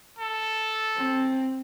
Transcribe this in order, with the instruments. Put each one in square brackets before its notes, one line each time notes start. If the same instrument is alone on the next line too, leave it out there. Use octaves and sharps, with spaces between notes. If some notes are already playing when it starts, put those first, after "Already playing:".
[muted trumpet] A4
[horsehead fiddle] C4